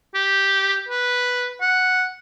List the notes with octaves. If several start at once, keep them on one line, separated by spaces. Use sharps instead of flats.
G4
B4
F#5